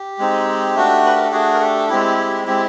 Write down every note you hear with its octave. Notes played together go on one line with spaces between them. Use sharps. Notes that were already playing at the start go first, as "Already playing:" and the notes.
Already playing: G4
G#3 C4 D#4
A3 D4 F#4
B4
A#4
A4
A3 D4 F#4 G#4
A#4
G4 A4
G#3 C4 E4 G4
G4
G#3 C4 E4 G4